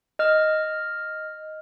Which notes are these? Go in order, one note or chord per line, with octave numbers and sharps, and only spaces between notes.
D#5 F6